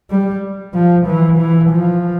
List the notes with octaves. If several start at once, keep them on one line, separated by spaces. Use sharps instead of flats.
G3
F3
E3
E3
F3